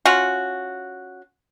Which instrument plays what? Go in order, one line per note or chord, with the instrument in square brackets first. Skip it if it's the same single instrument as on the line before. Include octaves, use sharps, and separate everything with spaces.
[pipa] C#4 F4 F#4